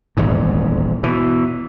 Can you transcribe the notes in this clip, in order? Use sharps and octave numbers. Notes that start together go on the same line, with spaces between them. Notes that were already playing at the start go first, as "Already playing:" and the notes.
D#1 G#1 E2 G#2
B2 E3